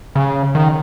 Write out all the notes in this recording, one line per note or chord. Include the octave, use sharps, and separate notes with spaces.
C#3
D#3